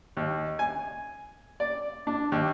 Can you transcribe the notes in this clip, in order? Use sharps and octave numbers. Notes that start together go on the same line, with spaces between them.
D#2
G#5
D5
D4
D#2